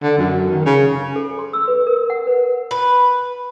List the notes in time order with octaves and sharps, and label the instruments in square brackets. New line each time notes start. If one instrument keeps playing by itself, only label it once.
[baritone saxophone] D3
F#2
D#3
C#3
[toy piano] A4
C6
E6
B4
A#4
F#5
B4
[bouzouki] B4